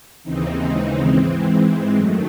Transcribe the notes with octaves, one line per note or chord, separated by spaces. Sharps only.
D#2 C#3 E3 C4 D#4
G#3 C4
G#2 E3
G#3 C4
F#2 D#3 F#3 A3